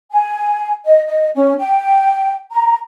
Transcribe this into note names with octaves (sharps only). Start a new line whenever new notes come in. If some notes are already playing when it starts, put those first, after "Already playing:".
G#5
D#5
D#5
C#4
G5
A#5